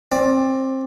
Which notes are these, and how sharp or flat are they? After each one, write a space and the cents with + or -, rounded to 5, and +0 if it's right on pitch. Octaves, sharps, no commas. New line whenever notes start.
C4 +20 D5 +0